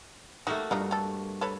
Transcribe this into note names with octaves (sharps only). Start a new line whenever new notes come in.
A3 A#3 D#4 F#4 G4
G2 D4 D#4 F4
G4 A4
A4 B4 C#5